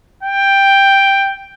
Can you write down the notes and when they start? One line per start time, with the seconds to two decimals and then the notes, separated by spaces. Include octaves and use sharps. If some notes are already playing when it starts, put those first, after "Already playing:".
0.23 G5